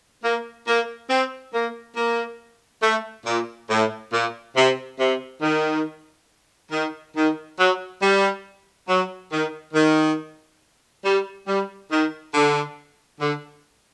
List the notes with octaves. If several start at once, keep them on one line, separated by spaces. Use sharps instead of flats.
A#3
A#3
C4
A#3
A#3
A3
A#2
A2
A#2
C3
C3
D#3
D#3
D#3
F#3
G3
F#3
D#3
D#3
G3
G3
D#3
D3
D3